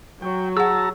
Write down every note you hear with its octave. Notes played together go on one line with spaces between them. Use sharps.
F#3 G5
F#4 G#4 F#5 A5 A#5 E6